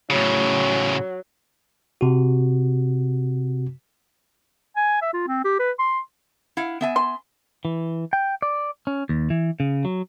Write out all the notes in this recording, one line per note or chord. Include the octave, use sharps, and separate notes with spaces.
A2 C#3 F#3
C3 F#4
G#5
E5
F4
C4
G4
B4
C6
E4 F5 F#5
B3 E5 G#5
C6
E3
G5
D5
C#4
D#2
E3
C#3
F#3